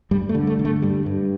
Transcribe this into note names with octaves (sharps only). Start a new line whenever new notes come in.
G2 G3
A3
D3
A3
D3
A3
G2 G3
G2